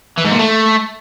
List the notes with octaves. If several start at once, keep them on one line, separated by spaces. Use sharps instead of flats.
E3
G#2
A#2
A3